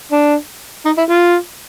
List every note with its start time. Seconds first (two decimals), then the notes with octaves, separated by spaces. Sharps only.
0.12 D4
0.85 D#4
0.98 E4
1.10 F4